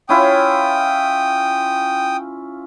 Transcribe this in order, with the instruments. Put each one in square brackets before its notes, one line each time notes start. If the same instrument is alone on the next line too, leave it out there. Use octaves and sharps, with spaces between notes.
[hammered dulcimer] C#4 E4 F4 [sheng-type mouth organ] G5 D#6